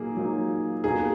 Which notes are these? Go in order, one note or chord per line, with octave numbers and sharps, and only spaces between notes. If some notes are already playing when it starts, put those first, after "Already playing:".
Already playing: A#2 F#3 A#3 D#4 G#4
A#2 F#3 A#3 D#4
B2 A#3 D#4 G#4